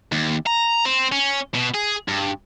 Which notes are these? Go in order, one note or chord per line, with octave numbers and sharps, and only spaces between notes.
D#2
A#5
C4
C#4
B2
G#4
G2